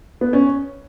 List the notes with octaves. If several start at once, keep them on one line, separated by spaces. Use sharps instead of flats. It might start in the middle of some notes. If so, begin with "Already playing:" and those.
B3
C#4